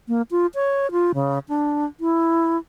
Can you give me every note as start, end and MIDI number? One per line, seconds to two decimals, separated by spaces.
0.08 0.22 58
0.31 0.47 65
0.54 0.91 73
0.92 1.12 65
1.14 1.39 49
1.49 1.85 62
2.00 2.57 64